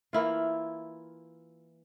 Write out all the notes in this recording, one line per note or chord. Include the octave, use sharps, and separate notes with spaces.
E3 A#3 E4 F4